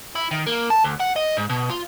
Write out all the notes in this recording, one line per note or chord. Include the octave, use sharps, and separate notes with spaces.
E4
D#3
A#3
A5
D2
F#5
D#5
G#2
B2
F4